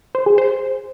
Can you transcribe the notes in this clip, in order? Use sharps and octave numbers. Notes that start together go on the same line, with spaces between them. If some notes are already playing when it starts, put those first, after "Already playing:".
C5
G#4
C5